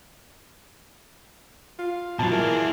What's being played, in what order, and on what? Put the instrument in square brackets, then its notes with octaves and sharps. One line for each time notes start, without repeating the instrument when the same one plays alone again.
[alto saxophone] F4
[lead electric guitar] B2 F#3 [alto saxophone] F3 [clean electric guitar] F4 A5
[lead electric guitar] E4 G#4 [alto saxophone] A#4